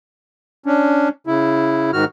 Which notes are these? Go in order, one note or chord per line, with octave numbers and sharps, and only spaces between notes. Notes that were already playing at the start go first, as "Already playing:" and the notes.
C#4 D4
C#3 E4
G#2 D#3 F#4 F6